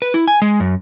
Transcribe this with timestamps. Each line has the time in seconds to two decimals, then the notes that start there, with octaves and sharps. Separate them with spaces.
0.02 B4
0.14 E4
0.28 G#5
0.42 G#3
0.60 F#2